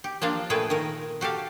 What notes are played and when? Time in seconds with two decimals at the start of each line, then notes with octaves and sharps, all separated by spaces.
0.04 G4
0.22 F3 A#3 D4 F5
0.50 A#2 A3 G#4 A4 B4 G5
0.70 D#3 A#4
1.21 F#4 G4 A4 F5